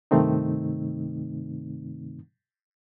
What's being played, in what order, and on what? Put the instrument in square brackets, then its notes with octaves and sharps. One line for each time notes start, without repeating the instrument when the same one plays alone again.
[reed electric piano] G2 C3 D#3 A3 C4 D#4